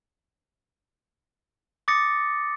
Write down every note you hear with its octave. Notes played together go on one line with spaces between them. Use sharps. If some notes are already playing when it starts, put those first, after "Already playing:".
D6 D#6 A6 A#6 C#7